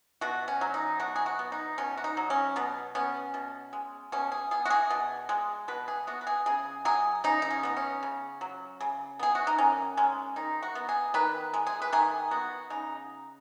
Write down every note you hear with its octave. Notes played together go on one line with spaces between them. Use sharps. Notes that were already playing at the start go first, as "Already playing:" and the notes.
B2 F#4
C#4
F#3
D#4
B2 F#4
G#4
F#4
B3
D#4
B2 C#4
F#4
D#4
F#3
C#4
B2 B3
B3 C#4
B2
G#3
B2 C#4
G#4
B3 G#4
F#4
G#4
B2
G#3
B2 B4
G#4
B3 F#4
B4
G#4
C#3 G#4
F#3 G#4
C#3 D#4
D#4
C#4
B3 D#4
C#4
C#3
F#3
C#3
B3 G#4
F#4
D#4
D#3 C#4
G#3 C#4
D#3 D#4
F#4
B3
G#4
D#3 B4
G#3
G#4
B4
D#3 G#4
B3 F#4
C#3 D#4